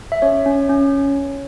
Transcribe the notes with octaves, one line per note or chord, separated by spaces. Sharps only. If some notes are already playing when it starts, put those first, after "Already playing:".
E5
C#4 C#5
C#4
C#4